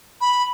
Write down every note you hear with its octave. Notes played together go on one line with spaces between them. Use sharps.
B5